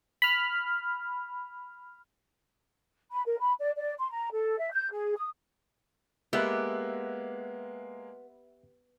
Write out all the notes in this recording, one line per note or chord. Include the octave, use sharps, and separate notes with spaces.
B5 F6
B5
A#4
B5
D5
D5
C6
A#5
A4
E5
G6
G#4
D#6
G#3 A#3 B3 G4 E5 E6 F#6